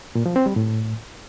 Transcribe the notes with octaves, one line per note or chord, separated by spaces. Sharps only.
A#2
F3
C4
G3
A2